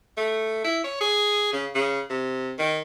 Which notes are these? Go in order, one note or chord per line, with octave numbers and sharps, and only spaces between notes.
A3
E4
C#5
G#4
C#3
C#3
C3
D#3